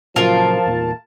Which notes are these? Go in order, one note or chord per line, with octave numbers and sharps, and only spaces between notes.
A#2 C#3 F3 F#3 F4 A#4 A5
E2 A#2